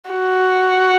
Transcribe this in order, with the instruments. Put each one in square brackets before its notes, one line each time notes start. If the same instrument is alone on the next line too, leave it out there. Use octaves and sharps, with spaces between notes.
[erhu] F#4